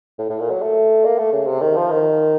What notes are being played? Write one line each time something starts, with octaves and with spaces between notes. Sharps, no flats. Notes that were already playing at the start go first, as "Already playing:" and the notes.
A2
A2
A#2
F#3
A3
A#3
A3
C#3
C3
D#3
F3
D#3